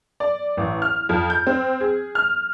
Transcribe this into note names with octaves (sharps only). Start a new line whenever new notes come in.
D5
A1
F6
F2
G6
C4
G#4
F6